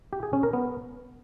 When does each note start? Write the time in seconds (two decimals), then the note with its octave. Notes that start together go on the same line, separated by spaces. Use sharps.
0.13 G4
0.23 G#4
0.33 C#4
0.43 A#4
0.53 B3